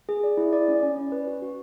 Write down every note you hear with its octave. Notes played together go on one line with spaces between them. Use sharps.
G#4
D5
E4
D5
C#4
C#4
C#4
B4
F#4
F#4